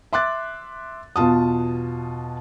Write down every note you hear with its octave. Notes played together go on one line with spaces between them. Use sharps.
E5 C6 D6 F#6 A6
E2 B2 F4 A5 D#6